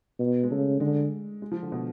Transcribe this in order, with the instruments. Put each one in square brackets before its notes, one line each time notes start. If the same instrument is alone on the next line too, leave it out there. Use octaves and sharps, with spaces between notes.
[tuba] B2
[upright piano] G#3
[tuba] C#3 [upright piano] A3
[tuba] D3 [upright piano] G#3
[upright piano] G#3
F3
D3
B2